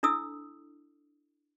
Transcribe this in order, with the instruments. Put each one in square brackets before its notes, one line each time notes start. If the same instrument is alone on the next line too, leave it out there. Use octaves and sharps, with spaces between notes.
[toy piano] D4 E4 A4 D#6 E6